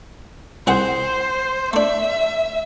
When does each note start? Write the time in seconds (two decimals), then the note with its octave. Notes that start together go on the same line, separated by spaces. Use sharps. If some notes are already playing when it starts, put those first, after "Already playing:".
0.67 C2 G#4 C5 F#5
1.73 A3 D4 E5